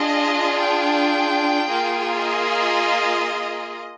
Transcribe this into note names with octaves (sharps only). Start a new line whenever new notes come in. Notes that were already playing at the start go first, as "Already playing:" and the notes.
Already playing: D4 F4 G#4 D#5
G5
A#3 F4 G#4
D#5